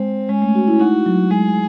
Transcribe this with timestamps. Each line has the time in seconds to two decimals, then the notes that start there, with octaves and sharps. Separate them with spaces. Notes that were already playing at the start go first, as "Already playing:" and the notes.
Already playing: G#3 C4
0.29 G#3 C#4
0.42 A3
0.55 F#4
0.67 E4
0.80 D#4 F#4
1.06 F#3
1.31 G#3 G#4